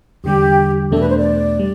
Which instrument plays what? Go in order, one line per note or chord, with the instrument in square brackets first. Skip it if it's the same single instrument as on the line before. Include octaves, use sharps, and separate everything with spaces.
[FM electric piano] E2 D3 G3 [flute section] G4
[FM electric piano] E2 B2 A3 D4 [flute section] A4
[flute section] B4
C5
D5
[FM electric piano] G3